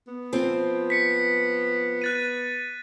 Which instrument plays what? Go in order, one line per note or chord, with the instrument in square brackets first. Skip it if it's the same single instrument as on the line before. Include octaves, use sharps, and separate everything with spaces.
[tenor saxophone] B3
[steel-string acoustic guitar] F3 C4
[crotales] B6 C#7
F#6 A6 D#7